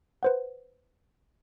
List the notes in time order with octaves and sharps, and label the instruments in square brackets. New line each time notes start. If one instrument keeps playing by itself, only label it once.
[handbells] B4 C5 F#5